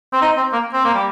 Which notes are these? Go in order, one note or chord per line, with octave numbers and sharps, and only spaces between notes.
C4
D#4
C4
A#3
C4
A#3
G3